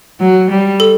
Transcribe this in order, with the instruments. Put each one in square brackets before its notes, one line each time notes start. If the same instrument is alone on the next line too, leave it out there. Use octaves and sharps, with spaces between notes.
[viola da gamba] F#3
G3
[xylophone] A4